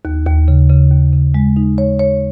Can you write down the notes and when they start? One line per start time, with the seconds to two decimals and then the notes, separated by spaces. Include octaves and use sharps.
0.05 D#2
0.26 D#2
0.48 C#3
0.70 C#3
0.91 D#2
1.13 C#3
1.34 G#3
1.56 D#4
1.78 C#5
1.99 C#5